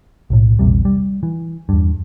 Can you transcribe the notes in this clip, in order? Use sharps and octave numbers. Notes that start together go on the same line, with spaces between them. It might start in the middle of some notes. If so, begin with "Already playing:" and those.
B1 A2
A#1 E2 C3 G3
G3
E3
E2 G2